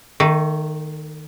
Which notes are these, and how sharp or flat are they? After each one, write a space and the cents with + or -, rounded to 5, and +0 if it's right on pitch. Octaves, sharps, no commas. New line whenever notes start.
D#3 -10 A3 +25